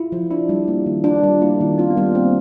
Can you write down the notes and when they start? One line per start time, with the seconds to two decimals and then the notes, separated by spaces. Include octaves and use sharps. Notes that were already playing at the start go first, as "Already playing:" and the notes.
Already playing: E4 F4
0.12 F3
0.30 D4 E4
0.49 G3
0.68 A#3
0.86 D#3
1.04 D4 F4
1.24 G3
1.42 A#3 E4
1.60 D#3 D#4
1.78 C4 F4
1.90 B3
1.97 G3
2.03 A#3
2.15 A#3 C4